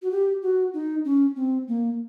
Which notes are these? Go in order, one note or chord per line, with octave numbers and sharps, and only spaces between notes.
F#4
G4
F#4
D#4
C#4
C4
A#3